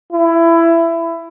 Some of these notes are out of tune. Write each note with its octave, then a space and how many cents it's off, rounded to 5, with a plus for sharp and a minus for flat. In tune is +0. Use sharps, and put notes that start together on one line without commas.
E4 +20